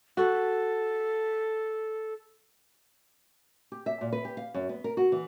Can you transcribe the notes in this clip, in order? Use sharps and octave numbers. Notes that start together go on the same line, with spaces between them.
F#4 A4
G4
E5
A#2
B4
G4
F5
F#2
B3
A#4
F#4
E3